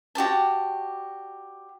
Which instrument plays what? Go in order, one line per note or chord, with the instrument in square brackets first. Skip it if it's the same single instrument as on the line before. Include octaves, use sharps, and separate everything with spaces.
[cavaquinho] F#4 G4 D5 A5